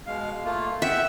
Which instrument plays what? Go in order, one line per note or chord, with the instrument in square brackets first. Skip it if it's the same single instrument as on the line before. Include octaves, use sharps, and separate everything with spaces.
[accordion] B2 G#3 F5
A3 A#3 F4
[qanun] E5 [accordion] F#5 G5